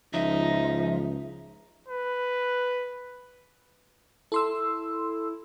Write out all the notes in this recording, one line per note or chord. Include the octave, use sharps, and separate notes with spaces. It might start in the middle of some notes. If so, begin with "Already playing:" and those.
C#2 F3 D#4 E5
B4
E4 A4 C6 E6